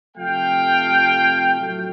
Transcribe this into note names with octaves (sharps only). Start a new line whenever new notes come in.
C3 F3 A3 F5 G5
A2 F#3 A3